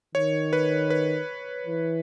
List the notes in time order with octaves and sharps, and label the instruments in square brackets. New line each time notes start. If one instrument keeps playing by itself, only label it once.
[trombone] D#3 [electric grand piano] C#5
[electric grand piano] B4
B4
[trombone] E3